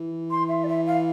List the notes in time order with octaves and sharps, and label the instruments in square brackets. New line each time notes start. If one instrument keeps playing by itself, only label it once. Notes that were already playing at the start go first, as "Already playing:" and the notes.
Already playing: [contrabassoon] E3
[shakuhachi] C6
E5
D5
E5
F5